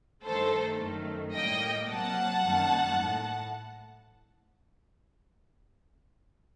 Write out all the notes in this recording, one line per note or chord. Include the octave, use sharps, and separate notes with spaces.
G2 D#3 A3 A4 C5
F#2 D#3 A3
A2 G3 A#3 D#5 G5
C3 F#3 A#3 F#5 A5
F#2 D#3 G3 A#3
A2